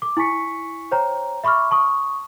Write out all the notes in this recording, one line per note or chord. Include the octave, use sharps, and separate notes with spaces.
D6
E4 G#5 C#6 B6 C#7
C5 C#5 G5 A#5
E5 B5 C#6 D6 F6
A5 C#6 D#6